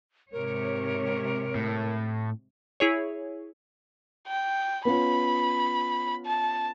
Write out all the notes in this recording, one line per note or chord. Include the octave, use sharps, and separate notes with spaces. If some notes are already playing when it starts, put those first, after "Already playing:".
G#2 C3 A#4 C#5
A2
E4 G#4 C#5
G5
B3 C#4 F4 B5
A5